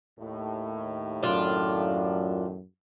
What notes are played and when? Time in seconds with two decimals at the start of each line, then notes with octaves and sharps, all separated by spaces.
0.19 D#2 A2
1.23 F#2 D4 F4